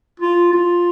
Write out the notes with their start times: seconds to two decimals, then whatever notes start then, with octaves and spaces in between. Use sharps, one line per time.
0.20 F4
0.53 F4